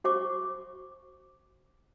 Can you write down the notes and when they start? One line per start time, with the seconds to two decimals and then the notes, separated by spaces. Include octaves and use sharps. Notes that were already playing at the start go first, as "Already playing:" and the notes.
0.04 F#4 C5 C#6 D6